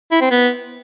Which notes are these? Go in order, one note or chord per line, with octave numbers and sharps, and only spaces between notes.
E4
C4
B3